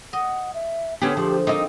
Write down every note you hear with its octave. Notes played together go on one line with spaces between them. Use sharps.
D#5 F#5
E5
D3 A3 B3 C#4 G4 G#4
F3 G4
C4 D#4 F4 A#4 D5 D#5